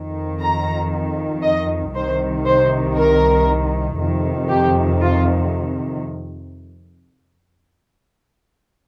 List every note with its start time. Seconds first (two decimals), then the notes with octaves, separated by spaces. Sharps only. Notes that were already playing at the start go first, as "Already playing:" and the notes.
Already playing: F2 D#3
0.42 A#5
1.44 D#5
1.95 C2 C3 D#3 C5
2.46 C5
2.97 A#4
3.99 F2 C3 D#3
4.49 G4
5.01 F4